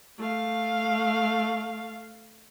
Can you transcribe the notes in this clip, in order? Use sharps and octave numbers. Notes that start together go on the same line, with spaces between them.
A3 F5